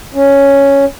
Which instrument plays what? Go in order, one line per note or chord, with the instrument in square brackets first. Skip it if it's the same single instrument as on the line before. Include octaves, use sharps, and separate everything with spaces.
[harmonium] C#4